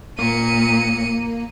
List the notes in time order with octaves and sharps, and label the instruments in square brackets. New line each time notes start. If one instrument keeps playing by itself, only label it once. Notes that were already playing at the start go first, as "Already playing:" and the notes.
[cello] A#2 [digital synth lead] A#3 [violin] C#7 D#7